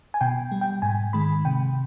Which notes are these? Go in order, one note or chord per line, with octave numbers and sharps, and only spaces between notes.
G#5
B2 G5
G3
G5
G#2 G#5
D#3 G#3 B5
C3 G5